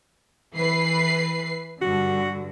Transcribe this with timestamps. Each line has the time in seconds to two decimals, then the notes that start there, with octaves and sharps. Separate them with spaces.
0.56 E3 B4 C7
1.82 G2 D3 F#4